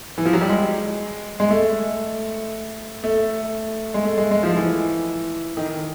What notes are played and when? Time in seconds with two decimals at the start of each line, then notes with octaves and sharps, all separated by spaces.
0.18 E3
0.25 F3
0.33 F#3
0.41 G3
0.49 G#3
1.40 G#3
1.51 A3
3.04 A3
3.94 G#3
4.05 A3
4.18 G#3
4.31 G#3
4.43 F3
4.56 E3
5.57 D#3